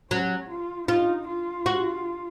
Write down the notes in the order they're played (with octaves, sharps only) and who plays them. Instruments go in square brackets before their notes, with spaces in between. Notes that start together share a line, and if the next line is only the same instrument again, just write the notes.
[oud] F#3 [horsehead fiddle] C#4
[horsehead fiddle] F4
[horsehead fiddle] D#4 [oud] F4
[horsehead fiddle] F4
[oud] F#4